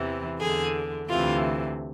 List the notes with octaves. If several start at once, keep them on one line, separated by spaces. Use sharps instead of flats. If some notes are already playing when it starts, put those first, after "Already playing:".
Already playing: E2 C3 E3
E2 D3 G#4
D2 C3 E3 F4